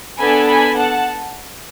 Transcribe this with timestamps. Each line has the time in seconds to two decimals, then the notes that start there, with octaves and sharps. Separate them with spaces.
0.18 B3 D4 A4 G#5 B5
0.48 G#5 B5
0.78 F#5 A5